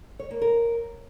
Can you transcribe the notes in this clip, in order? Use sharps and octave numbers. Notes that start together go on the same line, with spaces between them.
C#5
A#3
A#4